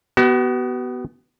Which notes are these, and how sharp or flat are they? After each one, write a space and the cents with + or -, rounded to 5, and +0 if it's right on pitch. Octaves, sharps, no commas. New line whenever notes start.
B3 +0 F#4 +40